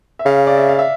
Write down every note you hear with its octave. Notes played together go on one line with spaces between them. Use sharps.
E5
C#3 F5
F5
D5
E5
F5
E5